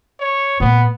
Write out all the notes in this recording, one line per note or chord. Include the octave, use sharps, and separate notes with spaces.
C#5
A#2 B3